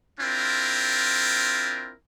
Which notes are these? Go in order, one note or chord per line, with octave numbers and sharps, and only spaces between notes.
C4 D4 E4 F4 A#4